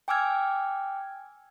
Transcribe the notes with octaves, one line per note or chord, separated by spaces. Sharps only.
G5 G#5 D6 E6 F6 G#6